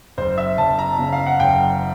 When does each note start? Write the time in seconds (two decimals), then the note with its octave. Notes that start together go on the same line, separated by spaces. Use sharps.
0.17 F#1 C5
0.38 E5
0.58 F#1 A5
0.79 A#5
0.99 C#3
1.13 F5
1.26 F#5
1.40 F#1 G5